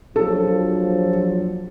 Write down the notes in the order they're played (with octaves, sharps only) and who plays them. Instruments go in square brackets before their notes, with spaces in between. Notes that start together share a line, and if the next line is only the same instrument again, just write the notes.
[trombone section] A#1 F3 F#3 [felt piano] A4